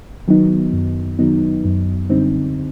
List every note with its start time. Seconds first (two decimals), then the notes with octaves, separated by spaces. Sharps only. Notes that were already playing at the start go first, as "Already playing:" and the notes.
0.28 D#3 F#3 B3 D#4
0.73 F#2
1.19 D#3 F#3 B3 D#4
1.65 F#2
2.10 D3 G3 C4 D#4